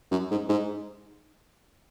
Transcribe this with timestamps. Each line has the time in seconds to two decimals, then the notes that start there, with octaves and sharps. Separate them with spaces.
0.11 F#2
0.31 G#2
0.49 G#2